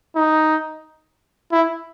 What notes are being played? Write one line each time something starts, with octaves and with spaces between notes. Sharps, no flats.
D#4
E4